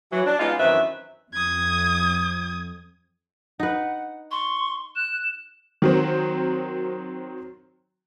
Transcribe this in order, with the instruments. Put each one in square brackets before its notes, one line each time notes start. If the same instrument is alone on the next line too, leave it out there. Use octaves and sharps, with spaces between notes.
[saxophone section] E3 F#3
D4
G#3 B3 C#4 D#4 F4
F#2 D#3 E3 C4 B4 E5
[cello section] F2 [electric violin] D#6 G#6
[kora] D#4 B4 [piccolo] F#5
[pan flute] C6 [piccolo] C#6
[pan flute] F#6 [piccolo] E7
[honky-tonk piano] D#3 F#3 C4